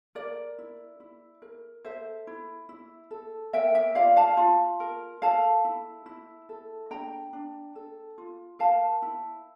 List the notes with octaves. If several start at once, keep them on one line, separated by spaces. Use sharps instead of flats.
A#4 D5
E4
E4
A#4
A4 C5 E5
E4
E4
A4
A#4 E5 G5
E5 G5
F4 D5 F5
F5 A5
F4
A#4
A4 F5 A5
E4
E4
A4
D4 G5 A#5
D4
A4
F4
A#4 F5 A5
E4